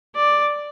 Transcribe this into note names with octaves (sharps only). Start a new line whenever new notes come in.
D5